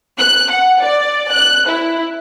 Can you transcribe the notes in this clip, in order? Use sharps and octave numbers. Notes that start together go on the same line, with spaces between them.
F#6
F#5
D5
F#6
E4